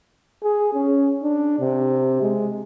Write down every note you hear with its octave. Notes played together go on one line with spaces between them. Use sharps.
G#4
C#4
D4
C3
G#3